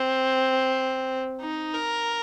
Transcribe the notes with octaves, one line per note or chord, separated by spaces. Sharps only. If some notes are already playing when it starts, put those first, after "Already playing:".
Already playing: C4
D#4
A#4